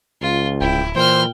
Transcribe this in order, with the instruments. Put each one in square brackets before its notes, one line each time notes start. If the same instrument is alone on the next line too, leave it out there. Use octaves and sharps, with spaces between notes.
[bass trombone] C#2 [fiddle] F4
[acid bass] D1 [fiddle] E4 [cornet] G5
[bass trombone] A#2 [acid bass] E3 [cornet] C5 [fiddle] G5 F6